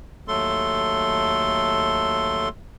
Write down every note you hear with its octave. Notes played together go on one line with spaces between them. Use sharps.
D#2 F#3 A3 A4 C6